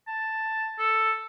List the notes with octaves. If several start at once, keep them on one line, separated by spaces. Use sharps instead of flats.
A5
A4